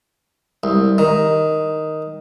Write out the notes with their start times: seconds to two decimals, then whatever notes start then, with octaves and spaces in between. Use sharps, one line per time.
0.64 C2
0.98 D#3